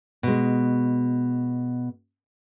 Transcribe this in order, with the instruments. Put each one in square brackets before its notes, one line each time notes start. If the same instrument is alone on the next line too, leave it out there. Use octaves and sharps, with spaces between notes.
[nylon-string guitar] B2 G#3